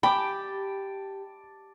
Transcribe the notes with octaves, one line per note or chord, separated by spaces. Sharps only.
G4 G5 A5 B5 D6